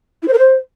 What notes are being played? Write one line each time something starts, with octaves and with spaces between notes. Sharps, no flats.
E4
C5
A#4
C5